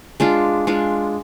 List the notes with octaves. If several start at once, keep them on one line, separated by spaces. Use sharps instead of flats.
G#3 D4 F4
G#3 D4 F4